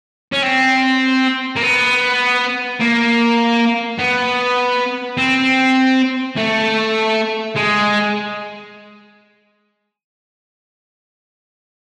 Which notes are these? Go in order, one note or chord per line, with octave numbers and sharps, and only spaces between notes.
C#4
C4
A#3
B3
A#3
B3
C4
A3
G#3